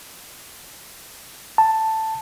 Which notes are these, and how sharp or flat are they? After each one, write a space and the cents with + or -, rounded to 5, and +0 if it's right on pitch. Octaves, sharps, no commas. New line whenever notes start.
A5 +5